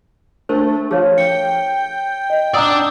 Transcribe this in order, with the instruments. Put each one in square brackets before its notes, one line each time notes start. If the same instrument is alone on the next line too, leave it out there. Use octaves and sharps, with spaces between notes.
[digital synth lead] A3 [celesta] D4 [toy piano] A#4 C5
[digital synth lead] F3 [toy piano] G#4 C#5 F5
[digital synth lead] G5 [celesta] C#7
[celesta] D#5
[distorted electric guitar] D4 D5 [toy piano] F#5 [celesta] A#5 D#6 E6